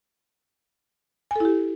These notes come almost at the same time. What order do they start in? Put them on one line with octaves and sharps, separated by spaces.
G#5 A4 E4 G4